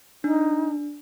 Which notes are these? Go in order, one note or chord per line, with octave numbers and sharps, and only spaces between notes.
D4 D#4